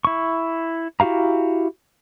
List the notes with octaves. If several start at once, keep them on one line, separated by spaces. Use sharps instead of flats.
E4 C#6
E4 F#4 G4 F5 A#5